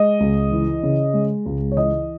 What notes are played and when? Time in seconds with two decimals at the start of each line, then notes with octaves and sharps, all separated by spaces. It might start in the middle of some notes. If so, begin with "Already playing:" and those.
Already playing: G#3 D#5
0.20 C#2
0.52 E3
0.83 C#3
1.14 G#3
1.46 C#2
1.71 C#5
1.76 E3 D#5